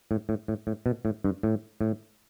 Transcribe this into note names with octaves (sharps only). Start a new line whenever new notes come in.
A2
A2
A2
A2
B2
A2
G2
A2
A2